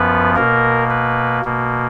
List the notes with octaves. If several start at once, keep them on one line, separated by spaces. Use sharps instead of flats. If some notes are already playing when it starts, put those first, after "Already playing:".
Already playing: F#2 F3 B3 B4
B2 A#3 A#4
B4
B2 A#3